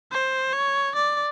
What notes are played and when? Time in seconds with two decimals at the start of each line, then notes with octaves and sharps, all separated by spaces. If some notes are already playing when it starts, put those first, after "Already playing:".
0.12 C5
0.53 C#5
0.95 D5